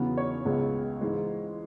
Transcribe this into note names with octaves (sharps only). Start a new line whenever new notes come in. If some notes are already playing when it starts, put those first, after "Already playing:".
Already playing: E2 C#3 F#3 B3
C#5
C#2 C#3 G#3 B3
G#2 E3 G#3